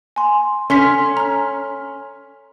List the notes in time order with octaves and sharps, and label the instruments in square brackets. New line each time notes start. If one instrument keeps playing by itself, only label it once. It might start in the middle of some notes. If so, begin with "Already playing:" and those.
[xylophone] G#5 C6
[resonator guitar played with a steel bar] C#4 [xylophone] A4 C6 B6
[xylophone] A#5 F6